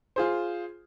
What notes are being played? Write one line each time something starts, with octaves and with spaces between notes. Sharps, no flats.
F4 G#4 C5